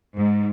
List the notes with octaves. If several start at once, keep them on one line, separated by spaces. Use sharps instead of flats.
G#2